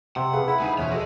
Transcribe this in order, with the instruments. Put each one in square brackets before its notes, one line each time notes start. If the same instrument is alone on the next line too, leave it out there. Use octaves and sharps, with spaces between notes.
[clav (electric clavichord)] C3 [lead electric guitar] F#5
[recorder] G#4 [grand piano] A4 B4 F5
[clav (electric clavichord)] E4 [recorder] B5
[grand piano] D2 D#4 D#7 [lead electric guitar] A4 G#5
[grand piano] E2 B2 F3 [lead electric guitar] C#5 G#5 [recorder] E5
[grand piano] F#4 A4 [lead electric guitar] G#4 D#5